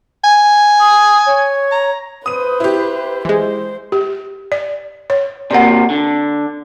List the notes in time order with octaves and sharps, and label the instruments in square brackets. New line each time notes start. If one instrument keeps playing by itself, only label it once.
[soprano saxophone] G#5
[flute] D#6
C#5
[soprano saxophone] A#5
[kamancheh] B4 C5 [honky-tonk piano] D#6 D#7
[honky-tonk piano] E4 G4
[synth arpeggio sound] E3 G#3 [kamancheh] C5
[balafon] G4
D5
C#5
[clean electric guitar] C3 A#3 [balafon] D5 F#5
[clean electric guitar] D3